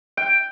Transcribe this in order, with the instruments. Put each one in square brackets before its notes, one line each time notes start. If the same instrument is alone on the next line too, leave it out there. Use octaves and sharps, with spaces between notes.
[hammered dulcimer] G5